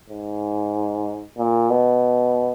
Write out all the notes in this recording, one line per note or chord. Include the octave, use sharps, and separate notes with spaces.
G#2
A#2
B2